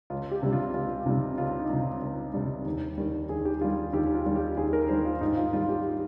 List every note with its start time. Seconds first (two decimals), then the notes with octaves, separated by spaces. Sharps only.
0.10 C#2 F4
0.31 G4
0.43 C3 G3
0.53 F4
0.74 C#2 F4
1.06 C3 G3 D#4
1.38 C#2 F4
1.59 D#4
1.70 C3 G3
1.81 F4
2.02 C#2
2.34 C3 G3
2.65 D#2
2.98 D#3 G3
3.29 D#2 G#4
3.45 G4
3.61 D#3 F4
3.64 G3
3.93 D#2 G4
4.14 F4
4.26 D#3 G3
4.36 G4
4.57 D#2 G#4
4.73 A#4
4.89 D#3 G3 C5
5.05 F4
5.21 G#2 D#4
5.37 F4
5.53 D#3 G3 F4
5.69 G4